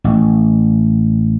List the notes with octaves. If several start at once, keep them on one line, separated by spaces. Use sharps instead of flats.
A1